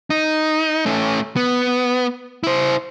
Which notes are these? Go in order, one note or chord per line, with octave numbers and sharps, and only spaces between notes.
D#4
A3 C#4
B3
E4 C5